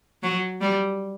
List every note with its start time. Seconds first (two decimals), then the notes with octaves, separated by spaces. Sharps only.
0.23 F#3
0.61 G3